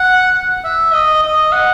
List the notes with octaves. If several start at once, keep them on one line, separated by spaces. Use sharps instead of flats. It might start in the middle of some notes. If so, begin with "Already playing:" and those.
Already playing: F#5
E5
D#5
D#5
F#5